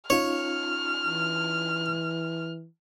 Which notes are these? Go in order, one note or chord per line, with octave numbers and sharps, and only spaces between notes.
C#4 D#4 F4 C#5 F6
E3